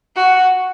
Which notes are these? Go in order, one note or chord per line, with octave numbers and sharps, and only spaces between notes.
F#4